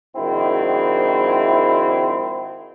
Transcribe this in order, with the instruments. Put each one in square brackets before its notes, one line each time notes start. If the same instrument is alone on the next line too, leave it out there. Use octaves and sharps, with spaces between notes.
[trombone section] A#1 G#2 D#3 C4 E4 F#4